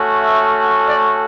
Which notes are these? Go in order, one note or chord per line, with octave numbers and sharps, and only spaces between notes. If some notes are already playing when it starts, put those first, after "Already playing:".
Already playing: A3 C#4 F#4
E5
D5